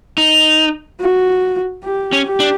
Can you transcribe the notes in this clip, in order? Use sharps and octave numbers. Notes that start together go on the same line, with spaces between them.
D#4
F#4
G4
C#4
G4
D4